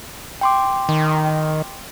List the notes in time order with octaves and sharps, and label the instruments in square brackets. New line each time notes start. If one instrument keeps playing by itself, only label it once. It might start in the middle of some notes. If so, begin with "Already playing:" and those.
[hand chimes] G5 C6 D6
[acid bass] D#3